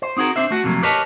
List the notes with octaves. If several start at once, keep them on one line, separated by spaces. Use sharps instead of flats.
C5
C4 D#4 F#4 G#4 A#4
C4 D4 C5 E5
A3 F#4
F2 C3 F#3 A3 A#3
G4 A#4 B4 C#5 D#5 A5